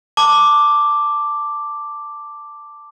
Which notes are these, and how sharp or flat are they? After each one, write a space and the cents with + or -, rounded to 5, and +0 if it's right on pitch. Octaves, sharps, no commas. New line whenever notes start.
A5 +10 D6 +0